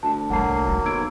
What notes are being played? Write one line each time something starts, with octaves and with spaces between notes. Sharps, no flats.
D2 A5
C2 D3 F#3 A#3 F#5 A5 C7
D#3
B1 E6 G#6 D7